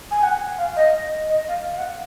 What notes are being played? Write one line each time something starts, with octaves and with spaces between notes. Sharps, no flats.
G#5
F#5
F5
D#5
D#5
F5
F5
F#5